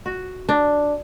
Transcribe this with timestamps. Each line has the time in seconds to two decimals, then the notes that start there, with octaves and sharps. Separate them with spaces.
0.06 F#4
0.49 D4